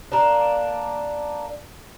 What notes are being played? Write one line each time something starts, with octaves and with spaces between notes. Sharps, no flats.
A#3 D4